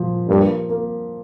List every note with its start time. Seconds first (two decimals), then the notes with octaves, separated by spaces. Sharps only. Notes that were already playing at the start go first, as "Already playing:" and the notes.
Already playing: A#2 F3
0.28 G2 A#3
0.69 A#3